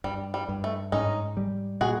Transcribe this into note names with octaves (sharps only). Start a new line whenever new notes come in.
G2 G3
G3
G2
A3
G#2 C#4 D#4
G3
A#2 F#4 G#4